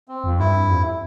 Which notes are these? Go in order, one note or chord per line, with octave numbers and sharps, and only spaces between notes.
C4
F2
G2 E4
F2